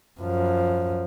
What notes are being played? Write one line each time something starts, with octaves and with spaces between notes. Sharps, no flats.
F#2 F3